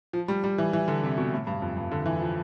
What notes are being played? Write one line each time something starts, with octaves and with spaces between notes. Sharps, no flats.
F3
G3
G3
E3
E3
D3
C3
B2
A2
G2
F2
G2
D3
E3
F3